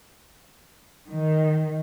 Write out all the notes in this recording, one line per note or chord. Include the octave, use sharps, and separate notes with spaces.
D#3